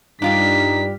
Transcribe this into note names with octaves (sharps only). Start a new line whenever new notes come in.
G2 G3 D4 D#4 F4 G4 B6